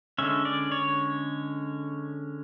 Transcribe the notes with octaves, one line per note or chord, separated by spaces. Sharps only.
D3 G#3 C#4 E5
D5
C#5